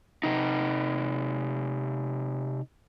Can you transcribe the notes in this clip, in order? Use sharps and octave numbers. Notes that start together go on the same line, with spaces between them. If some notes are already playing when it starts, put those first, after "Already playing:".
C3 D#4